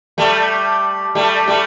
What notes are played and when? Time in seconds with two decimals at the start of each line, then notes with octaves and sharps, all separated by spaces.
0.18 G3 A3
1.15 G3 A3
1.47 G3 A3